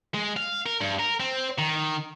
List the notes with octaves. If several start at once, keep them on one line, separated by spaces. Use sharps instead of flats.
G#3
F5
A#4
G2
A#4
C4
D#3